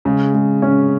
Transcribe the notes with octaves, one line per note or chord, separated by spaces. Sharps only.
C#3 G#3
G#3
C#4